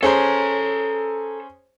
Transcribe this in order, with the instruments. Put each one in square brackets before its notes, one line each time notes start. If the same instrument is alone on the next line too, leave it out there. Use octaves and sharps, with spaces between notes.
[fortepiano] C#4 G#4 C5 [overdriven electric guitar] A4 A#5